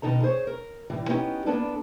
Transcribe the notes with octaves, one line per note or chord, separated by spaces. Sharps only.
B2 D#3 D#4 A4 A#5
G#4 C5 C#5
A#4
A2 E3 G3
B3 C#4 D#4 G4
A#3 B3 D4 A4 B4 D5